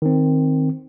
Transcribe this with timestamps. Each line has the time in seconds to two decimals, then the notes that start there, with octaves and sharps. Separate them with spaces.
0.02 D#3 C4